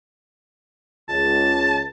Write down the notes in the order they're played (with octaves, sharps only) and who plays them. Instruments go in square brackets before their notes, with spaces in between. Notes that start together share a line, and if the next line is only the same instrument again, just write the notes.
[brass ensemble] C#2 [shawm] A5